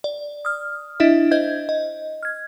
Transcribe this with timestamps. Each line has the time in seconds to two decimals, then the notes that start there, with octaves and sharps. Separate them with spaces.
0.04 D5
0.45 D#6 F6
1.00 D4 E4 D#5 E5
1.31 C5 D#5 G6 G#6
1.69 D#5
2.23 F6 G#6